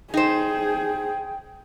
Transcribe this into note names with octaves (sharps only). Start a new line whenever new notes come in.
D#4 G#4 C5 G5